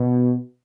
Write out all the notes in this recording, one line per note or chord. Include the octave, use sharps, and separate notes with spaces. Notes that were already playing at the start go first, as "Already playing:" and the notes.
Already playing: B2